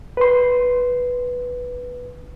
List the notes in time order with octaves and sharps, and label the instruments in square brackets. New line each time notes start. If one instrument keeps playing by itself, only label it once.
[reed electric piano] B4 C6